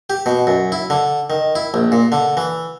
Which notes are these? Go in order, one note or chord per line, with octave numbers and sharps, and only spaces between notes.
G4
B2
F#2
E4
D3
D#3
E4
A#1
A#2
D3
E3